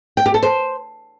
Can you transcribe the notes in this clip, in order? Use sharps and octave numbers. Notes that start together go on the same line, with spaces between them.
G5
G4
A4
C5